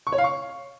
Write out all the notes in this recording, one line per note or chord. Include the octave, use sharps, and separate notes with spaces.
C#6
C#5
F5
C#6